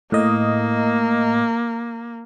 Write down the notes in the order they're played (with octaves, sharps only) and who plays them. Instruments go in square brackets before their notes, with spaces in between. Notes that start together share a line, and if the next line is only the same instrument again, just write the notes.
[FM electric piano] A2 D#5 [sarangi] A#3